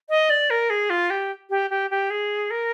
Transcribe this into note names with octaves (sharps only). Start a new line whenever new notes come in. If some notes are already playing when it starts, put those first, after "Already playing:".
D#5
D5
A#4
G#4
F4
G4
G4
G4
G4
G#4
A#4